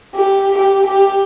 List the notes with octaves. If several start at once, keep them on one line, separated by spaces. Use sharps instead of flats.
G4
G4
G4